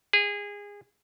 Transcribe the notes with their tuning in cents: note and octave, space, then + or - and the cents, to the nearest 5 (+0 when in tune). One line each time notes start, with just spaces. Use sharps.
G#4 -25